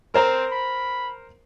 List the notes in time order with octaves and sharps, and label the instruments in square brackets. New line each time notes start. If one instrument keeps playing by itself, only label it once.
[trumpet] C4 [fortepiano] A#4 C5 A#5
[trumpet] B5